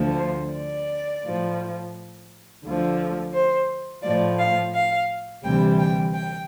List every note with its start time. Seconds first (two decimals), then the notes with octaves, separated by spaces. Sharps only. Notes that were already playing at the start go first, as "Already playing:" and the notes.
Already playing: D2 D3 F3
0.18 C5
0.53 D5
1.24 A2 F3
2.64 D2 D3 F3
3.33 C5
4.03 A2 F3 D5
4.39 F5
4.74 F5
5.44 D2 C3 E3 G3 G5
5.79 G5
6.14 G5